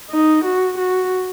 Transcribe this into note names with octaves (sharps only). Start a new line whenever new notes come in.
D#4
F#4
F#4